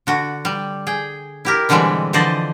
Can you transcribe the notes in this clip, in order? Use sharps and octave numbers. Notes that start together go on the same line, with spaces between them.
D3 F#4
G3
G#4 G5
E4 G4 A#4
B2 D3 E3 G3 G#3 C4
D3 E3 F3 C5 D5 D#5